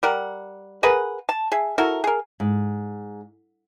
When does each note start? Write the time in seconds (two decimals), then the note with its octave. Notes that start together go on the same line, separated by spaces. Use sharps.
0.03 G3 A#4 F#5
0.83 G#4 A#4 B4 F#5
1.29 A5
1.52 G#4 E5
1.78 E4 F#4 A4 A#4
2.04 G#4 A#4
2.40 G#2